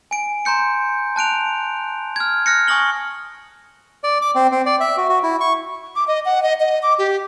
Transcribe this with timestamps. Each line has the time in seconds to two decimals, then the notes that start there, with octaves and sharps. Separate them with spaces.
0.11 G#5 D7
0.45 A#5 C6 G6 C#7
1.16 A5 F#6 D7 F7
2.16 F6 G#6
2.46 F6 F#6 A#6 C#7
2.67 G#5 C#6 D#6 A#6 F#7 G7
4.04 D5
4.22 D6
4.35 C4
4.52 C4
4.66 D5
4.80 E5
4.97 F#4
5.09 F#4
5.23 E4
5.40 C#6
5.96 D6
6.08 D#5
6.25 F#5
6.43 D#5
6.60 D#5
6.83 D6
6.99 G4